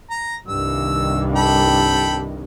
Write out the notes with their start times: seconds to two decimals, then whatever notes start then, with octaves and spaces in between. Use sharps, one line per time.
0.10 A#5
0.48 C2 G2 D#3 E6
1.36 A4 G5 B5